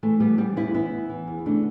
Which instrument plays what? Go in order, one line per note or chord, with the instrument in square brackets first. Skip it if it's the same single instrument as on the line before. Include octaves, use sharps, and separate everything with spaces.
[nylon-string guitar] E3 A3
E3 G3 B3
E3 G3
E2 B3 E4
E3 B3 E4
E3
E3
E2
D3 A3 D4